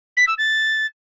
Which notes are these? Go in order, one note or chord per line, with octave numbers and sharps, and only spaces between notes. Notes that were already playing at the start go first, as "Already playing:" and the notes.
B6
E6
A6